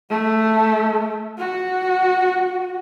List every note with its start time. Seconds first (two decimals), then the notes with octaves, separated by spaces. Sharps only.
0.10 A3
1.38 F#4